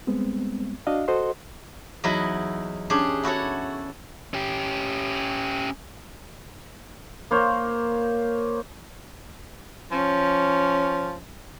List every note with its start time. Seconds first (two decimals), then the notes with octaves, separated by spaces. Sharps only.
0.07 G3 G#3 B3 C4
0.87 D4 F#4 D#5 F5
1.08 F#4 A4 C5 D#5 F#5 C6
2.04 E2 F#3 D#4 E4 D#5 B5
2.90 C#4 D4 G4 G#4
3.23 E4 F#4 A4 C#5
4.34 C#4 G4
7.31 A#3 C5 C#5
9.92 F3 C#4